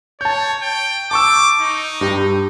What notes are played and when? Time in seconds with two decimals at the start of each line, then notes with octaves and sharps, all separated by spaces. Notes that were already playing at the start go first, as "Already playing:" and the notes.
0.21 C#5 A5 G6
0.63 G5
1.11 A5 C#6 D6 E6
1.60 D#4
2.01 G2 G4